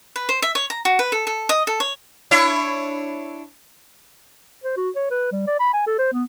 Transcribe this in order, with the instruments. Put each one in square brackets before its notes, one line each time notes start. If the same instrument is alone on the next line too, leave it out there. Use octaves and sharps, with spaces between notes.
[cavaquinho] B4
C5
E5
C#5
A#5
F#4
B4
A4
A4
D#5
A4
C#5
[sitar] D4 E4 C#5
[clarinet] C5
F#4
C#5
B4
G3
D5
B5
G#5
A4
C5
B3